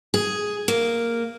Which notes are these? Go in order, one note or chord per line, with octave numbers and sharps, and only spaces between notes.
G#4
A#3